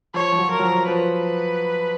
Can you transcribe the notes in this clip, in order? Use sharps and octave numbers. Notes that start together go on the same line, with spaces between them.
F3 C#5
F3
F#3
A#4
F#3
F3
F3 B4